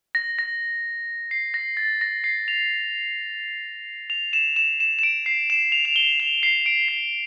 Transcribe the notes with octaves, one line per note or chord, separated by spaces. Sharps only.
A#6
A#6
C7
A#6
A6
A#6
C7
F7
F7
E7
E7
E7
E7
D7
C7
E7
F7
F7
G7
F7
C7
D7
C7